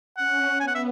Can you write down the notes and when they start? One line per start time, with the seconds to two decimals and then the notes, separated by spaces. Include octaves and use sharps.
0.17 C#4 F#5
0.60 B3 G#5
0.67 F#5
0.75 E5